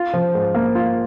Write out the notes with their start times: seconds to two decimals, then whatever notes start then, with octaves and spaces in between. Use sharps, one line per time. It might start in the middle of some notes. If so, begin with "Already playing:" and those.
Already playing: F4
0.14 F3
0.35 G#2
0.55 A#3
0.75 F4